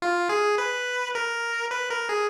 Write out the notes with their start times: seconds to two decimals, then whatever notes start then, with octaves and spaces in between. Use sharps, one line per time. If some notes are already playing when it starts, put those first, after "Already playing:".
0.02 F4
0.29 G#4
0.58 B4
1.15 A#4
1.71 B4
1.90 A#4
2.09 G#4